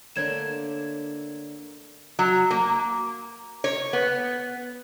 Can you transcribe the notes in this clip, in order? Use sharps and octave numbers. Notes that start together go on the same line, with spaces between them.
D3 A3 A#3 C#5 G#6 E7
F#3
A#3
C#5
B3